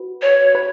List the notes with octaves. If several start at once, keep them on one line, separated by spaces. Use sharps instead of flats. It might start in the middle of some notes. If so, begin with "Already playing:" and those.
Already playing: F#4 B4
C#5
B4